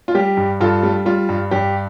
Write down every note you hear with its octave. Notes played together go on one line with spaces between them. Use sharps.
F4
G3 G4
G2
G2 F4 A4
G3
G3 F4
G2
G2 G4